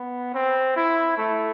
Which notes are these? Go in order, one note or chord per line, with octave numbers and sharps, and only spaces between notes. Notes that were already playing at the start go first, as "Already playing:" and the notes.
Already playing: B3
C4
E4
A3